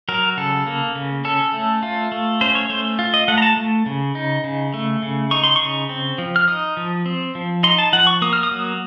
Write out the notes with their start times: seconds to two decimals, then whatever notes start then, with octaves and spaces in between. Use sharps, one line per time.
0.09 F#3 A#4
0.37 C#3 A4
0.66 A#3
0.95 C#3
1.25 C#4 A4
1.53 A3
1.83 F4
2.12 A3
2.41 C#4 C5
2.55 C#5
2.69 A3 C5
2.99 F4
3.14 D#5
3.28 A3 F#5
3.38 A#5
3.42 A5
3.57 A3
3.86 C#3
4.15 D#4
4.44 C#3
4.74 A3
5.02 C#3
5.31 D#4 C#6
5.44 C6
5.56 C#3 C#6
5.89 C4
6.18 F3
6.36 F6
6.48 D#4 D#6
6.77 F3
7.06 C4
7.35 F3
7.63 D#4 C6
7.78 A5
7.93 F3 F#5
8.07 C#6
8.22 A#3 D#6
8.33 F6
8.43 D#6
8.51 F#3